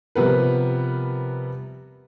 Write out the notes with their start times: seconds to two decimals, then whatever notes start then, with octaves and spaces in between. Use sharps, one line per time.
0.15 C3 F3 G3 B3 A#4 B4